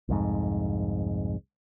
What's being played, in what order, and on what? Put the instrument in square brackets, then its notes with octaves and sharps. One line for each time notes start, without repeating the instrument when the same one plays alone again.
[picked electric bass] C2 F2 G#2